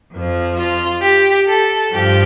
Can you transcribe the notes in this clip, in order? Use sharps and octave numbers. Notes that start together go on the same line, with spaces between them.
F2 F3
F4
G4
A4
G2 F3 G4